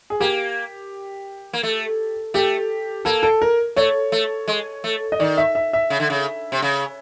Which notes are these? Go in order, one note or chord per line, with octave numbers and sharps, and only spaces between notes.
G#4
A#3 G4
A#3
A3
A3 G4
A#3 A4
A4
A#4
A3 C#5
A3
G#3
A3
D#5
D#3 D5
E5
E5
E5
C#3
D3
C#3
C3
C#3